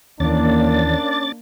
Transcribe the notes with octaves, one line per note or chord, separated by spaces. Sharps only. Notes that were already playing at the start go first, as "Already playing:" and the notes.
D#2 E3 A#3 C#4 D4 D5 A6